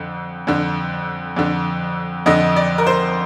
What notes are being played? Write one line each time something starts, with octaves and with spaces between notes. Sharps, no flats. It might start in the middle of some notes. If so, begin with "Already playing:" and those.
Already playing: F2 D3
F2 D3
F2 D3
F2 D3 D#5
D5
A#4
C5